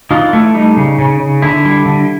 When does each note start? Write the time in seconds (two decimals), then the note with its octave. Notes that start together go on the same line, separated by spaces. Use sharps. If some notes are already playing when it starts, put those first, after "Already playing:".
0.11 E3 D#4 F4
0.33 A3 E4
0.54 G3 D#4
0.77 C#3
0.99 C#3
1.20 C#3
1.42 D3 E4
1.65 G3
1.86 D3